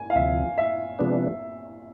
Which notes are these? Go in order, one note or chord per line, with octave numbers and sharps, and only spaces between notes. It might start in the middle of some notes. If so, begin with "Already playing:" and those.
Already playing: G#5
F5
D2 C3 F3 E5
E5
C3 F3 G#3 B3 D4